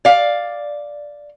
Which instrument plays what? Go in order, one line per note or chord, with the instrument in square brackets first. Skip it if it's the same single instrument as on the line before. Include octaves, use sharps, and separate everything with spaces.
[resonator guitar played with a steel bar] D5 F5